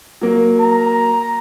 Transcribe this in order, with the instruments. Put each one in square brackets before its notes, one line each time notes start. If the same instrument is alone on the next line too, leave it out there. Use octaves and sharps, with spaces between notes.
[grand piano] F#3 A#3
[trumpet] A#5